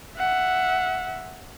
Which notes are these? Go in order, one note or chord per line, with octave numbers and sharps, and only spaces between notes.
E5 F#5